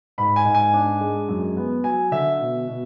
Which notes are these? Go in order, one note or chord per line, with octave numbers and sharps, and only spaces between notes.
G#2 B5
G#5
G#2
G#5
D4
G#3
F#2
B3
F#3 G#5
D3 E5
B2
B2